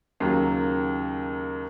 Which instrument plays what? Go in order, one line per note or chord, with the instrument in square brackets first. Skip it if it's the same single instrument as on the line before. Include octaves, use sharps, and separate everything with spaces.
[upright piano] D#2 C#3 F#3 A#3